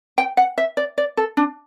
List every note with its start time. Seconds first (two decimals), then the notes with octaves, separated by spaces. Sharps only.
0.18 G5
0.37 F#5
0.58 E5
0.77 D5
0.98 D5
1.17 A4
1.37 D4